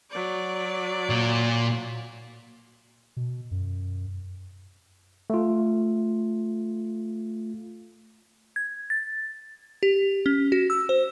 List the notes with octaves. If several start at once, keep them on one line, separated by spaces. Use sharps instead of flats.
F#3 D5
A#2
B2
F#2
A3 F4
G#6
A6
G4
C#4
F#4
E6
C5